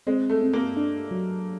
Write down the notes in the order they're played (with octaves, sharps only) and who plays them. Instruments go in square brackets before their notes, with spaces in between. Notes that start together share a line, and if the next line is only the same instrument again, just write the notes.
[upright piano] G#3 [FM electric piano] C4
[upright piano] A3
[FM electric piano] C4
[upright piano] A#3
[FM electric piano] D4
F#3